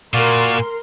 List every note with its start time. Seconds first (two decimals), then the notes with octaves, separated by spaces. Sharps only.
0.14 A#2 F#4 A#4 D5 F5 C6